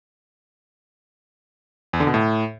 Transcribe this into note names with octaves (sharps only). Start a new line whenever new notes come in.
E2
D3
B2
A2